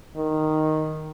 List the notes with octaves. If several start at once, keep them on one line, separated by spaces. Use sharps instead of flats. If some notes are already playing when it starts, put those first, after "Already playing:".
D#3